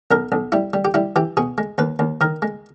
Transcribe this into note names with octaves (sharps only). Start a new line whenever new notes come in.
B1 A#4
B1
G3 E4
G3
G4
G3 E4
E3 G4
B2 G#4
G#3
D#2 B4
D#2
D#3 A#4
G#3